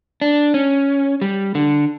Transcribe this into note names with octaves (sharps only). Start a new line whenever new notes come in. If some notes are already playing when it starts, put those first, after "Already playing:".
D4
C#4
G3
D3